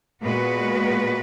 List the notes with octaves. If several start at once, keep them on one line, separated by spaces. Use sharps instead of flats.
A#2 G#3 B3 F#4 B4